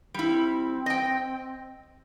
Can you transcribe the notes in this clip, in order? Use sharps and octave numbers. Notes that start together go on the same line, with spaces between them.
G3 C4 E4
D#5 G5